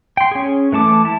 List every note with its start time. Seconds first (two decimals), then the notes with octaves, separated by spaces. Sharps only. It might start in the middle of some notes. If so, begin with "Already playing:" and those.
0.17 G5 C6
0.32 C#4 G#4
0.72 E3 A3 A5 D6
1.05 E4 A5